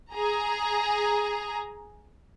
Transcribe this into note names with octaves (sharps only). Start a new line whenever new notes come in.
G#4 A#5